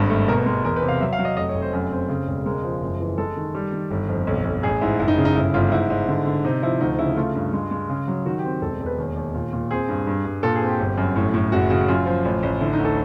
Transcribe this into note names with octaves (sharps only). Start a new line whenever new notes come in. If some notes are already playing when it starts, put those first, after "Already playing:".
Already playing: G#1 G2 A4
A3
B2 A#4
B4
G#3 A#4
E2 A#4
B4
C3
F5
F#3 E5
F5
F#3
D#5
F1 D#5
C#5
F1
C5
F#2
C4
C#3
E1
G#3 A#4
F3
F#1
E3
G#3 A4
D#3
G3
D#3
G1
F2
B1
B1
A1 G#4
G#2 E4
F#1 E4
D#4
C#3
D#4
G1 E4
G1 F4
G#2 E4
G#2
D3
D3
C3 D#4
F3 E4
D2 D#4
C#3 E4
A3 F4
G2
G#3
G#3
C#3
F#3
D#3 F#4
G4
C4
E1 A4
E1
B4
D#2
D#2
A#2
A#2
C4 G#4
G2
G2
G2
A#2 A4
G#4
C4
G4
G1
F#2
A2
A2
F#1 F#4
C#3 F#4
F#2 F4
F3
A1
A1
D3 E4
D#4
D2
A4